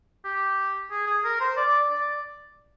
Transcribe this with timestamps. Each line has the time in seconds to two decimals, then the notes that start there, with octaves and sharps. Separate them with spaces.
0.25 G4
0.91 G#4
1.07 G#4
1.24 A#4
1.41 C5
1.57 D5
1.89 D5